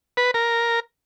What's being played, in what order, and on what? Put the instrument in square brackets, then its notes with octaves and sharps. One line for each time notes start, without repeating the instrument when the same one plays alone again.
[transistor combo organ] B4
A#4